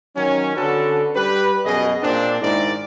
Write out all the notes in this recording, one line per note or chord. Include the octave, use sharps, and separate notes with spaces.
D#3 F#3 C#4
D3 C#4 F#4 A4 B4
G3 G4 B4
F#2 B2 G#4 D#5
A#2 C4 D4
G#2 D#3 E4 A#4 D5